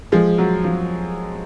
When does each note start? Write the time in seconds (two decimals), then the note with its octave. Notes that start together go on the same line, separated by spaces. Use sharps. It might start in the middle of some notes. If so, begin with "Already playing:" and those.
0.12 F3 G#3
0.38 F#3
0.64 F3